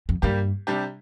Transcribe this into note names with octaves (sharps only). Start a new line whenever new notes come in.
F2
G2 G3 A#3 G4
C3 G3 D4 G4